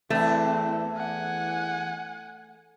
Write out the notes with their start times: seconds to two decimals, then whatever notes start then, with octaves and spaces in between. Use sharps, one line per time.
0.10 E2 A3 C4 E4
0.96 F#5 G#5